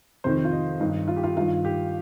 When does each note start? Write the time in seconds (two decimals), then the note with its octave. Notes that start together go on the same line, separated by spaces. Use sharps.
0.24 F2 C3 D#3 C5
0.44 F4
0.52 D#4
0.80 G2 D#3 D#4
1.08 F4
1.16 G4
1.23 F4
1.36 G2 D#3 F4
1.65 G4